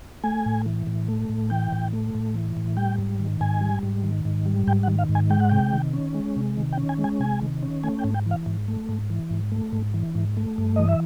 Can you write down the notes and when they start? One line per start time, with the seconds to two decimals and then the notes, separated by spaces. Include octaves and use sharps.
0.24 A3 G#5
0.46 A2
0.66 E3
0.87 A2
1.08 A3
1.29 A2
1.50 E3 G5
1.72 A2
1.93 A3
2.15 A2
2.34 E3
2.57 A2
2.77 G3 G5
2.99 G#2
3.20 D#3
3.41 G#2 G#5
3.61 G3
3.83 G#2
4.04 D#3
4.25 G#2
4.46 G3
4.67 G#2 G5
4.83 F#5
4.88 D#3
4.98 F5
5.09 G#2
5.15 G#5
5.30 G#3 G5
5.40 F#5
5.49 C3 G5
5.73 D#3
5.93 C#4
6.15 G#3
6.36 C3
6.57 D#3
6.73 G5
6.77 C#4
6.89 G#5
6.99 G#3
7.04 G#5
7.20 C3 G#5
7.42 D#3
7.63 C#4
7.83 A3 G#5
7.99 G5
8.04 G#2
8.14 G5
8.26 E3 F5
8.46 G#2
8.68 A3
8.89 G#2
9.10 E3
9.31 G#2
9.52 A3
9.73 G#2
9.94 E3
10.15 G#2
10.37 A3
10.58 G2
10.76 E3 D#5
10.88 E5